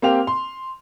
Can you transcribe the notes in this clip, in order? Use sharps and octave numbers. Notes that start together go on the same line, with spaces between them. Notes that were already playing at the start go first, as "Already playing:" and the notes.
A#3 C4 G4 F5 F7
C6